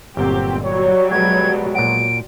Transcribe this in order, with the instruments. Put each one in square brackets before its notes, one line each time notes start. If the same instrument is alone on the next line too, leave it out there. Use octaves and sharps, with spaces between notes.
[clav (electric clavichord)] G1 A#2 [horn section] F#3 [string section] C4 G4
[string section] F#3 G3 [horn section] C#5
[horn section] B2 F3 G#3 [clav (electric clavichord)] F#4 B4 [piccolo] G#6
[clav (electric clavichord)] A#2 F#5 [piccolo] D7